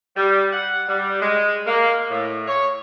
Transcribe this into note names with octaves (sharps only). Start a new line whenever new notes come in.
G3
F#5
G3
G#3
A#3
A2
C#5